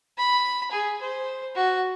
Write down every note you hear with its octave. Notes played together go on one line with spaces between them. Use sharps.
B5
G#4
C5
F#4